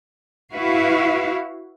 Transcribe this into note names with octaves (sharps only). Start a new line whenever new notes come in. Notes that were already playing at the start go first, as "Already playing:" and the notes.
E4 F#4 B4 F5